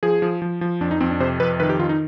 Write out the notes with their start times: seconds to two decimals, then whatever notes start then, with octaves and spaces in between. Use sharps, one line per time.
0.03 F3 G#4
0.22 F3
0.42 F3
0.61 F3
0.81 F2 D4
0.91 D#4
1.00 F2 C4
1.10 D4
1.20 C3 C5
1.40 F2 B4
1.60 D#3 B4
1.69 G4
1.79 D#3 F4
1.89 D#4